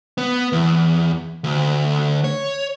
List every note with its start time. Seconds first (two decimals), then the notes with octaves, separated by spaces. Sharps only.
0.18 B3
0.53 E2
1.44 D2
2.24 C#5